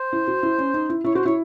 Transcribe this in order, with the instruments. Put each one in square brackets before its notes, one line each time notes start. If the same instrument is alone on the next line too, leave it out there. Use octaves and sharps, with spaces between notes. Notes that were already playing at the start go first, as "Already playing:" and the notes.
Already playing: [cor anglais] C5
[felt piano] E4
F#4
E4
C#4
D#4
E4
[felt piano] E4 [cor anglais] C#5
[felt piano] F#4 [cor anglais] C5
[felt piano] E4 [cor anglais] C#5